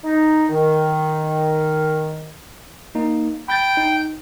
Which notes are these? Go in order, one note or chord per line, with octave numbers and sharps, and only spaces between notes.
D#4
D#3
A#3 D#4
G5 B5 G6 A6
D#4